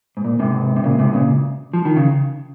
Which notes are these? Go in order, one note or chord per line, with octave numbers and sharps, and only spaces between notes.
G#2
A#2
G#2 C3
C3
A#2 C#3
G#2 C3
A#2 C#3
F3
D#3
C#3